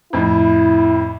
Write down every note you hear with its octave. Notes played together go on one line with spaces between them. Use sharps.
F2 A2 E4